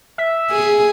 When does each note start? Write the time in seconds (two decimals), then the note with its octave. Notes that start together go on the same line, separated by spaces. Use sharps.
0.18 E5
0.51 G#4